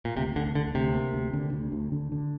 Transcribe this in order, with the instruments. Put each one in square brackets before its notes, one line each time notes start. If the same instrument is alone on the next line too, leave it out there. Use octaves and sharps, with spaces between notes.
[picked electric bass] A#2
[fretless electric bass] D2 [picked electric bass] C3
[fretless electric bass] D2 [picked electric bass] D3
[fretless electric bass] D2 [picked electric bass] D3
[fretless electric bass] D2 [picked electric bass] C3
[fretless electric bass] A#3
D2
D3
D2
D2
D3
D3